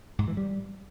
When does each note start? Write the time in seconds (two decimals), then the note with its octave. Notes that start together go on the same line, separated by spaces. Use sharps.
0.19 G#2
0.28 E3
0.37 G3